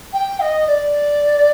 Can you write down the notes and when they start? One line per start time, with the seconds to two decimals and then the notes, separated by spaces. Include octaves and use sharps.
0.13 G5
0.40 D#5
0.67 D5